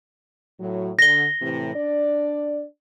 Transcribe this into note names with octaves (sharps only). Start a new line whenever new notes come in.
A2 F#3
D3 A#6 G7
A2 C3 E3
D4 D5